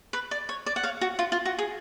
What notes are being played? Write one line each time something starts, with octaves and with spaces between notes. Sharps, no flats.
B4
D5
C#5
D5
F#5
C#5 F5
F#4
F4
F4
F#4
G#4